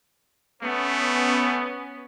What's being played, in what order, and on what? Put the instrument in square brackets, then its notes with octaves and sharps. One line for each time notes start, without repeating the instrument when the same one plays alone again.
[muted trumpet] A3 [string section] B3 C#4